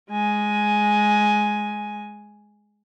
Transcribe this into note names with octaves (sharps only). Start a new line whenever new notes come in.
G#3 G#5